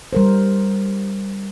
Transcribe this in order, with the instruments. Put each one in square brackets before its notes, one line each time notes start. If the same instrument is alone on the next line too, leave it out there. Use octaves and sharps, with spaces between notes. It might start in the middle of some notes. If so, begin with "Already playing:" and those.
[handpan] G3 A#4 C5